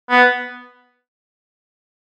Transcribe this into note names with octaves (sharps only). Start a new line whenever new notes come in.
B3